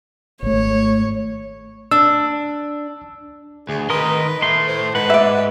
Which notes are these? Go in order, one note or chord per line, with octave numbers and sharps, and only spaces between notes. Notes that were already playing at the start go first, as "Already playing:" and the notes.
G#1 A3 C#5
D4 E6
D2 G#4
D#3 A#4 B4 D#5 C6
A2 A3 C6
C5
G#2 B4 F#5
D5 E5